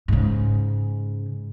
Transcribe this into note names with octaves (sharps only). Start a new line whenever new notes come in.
G#2 C#3